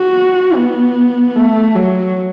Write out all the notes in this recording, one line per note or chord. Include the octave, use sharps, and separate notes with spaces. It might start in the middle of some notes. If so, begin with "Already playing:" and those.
Already playing: F#4
B3
A3
F#3